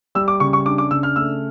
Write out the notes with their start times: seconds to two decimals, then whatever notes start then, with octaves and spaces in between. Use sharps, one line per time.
0.15 G3 E6
0.28 D6
0.40 C#3 C#6
0.53 C#6
0.66 D4 D6
0.78 D6
0.91 C#3 E6
1.03 F6
1.16 A3 E6